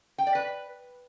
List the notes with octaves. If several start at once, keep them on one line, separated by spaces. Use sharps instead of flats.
G5
D5
B4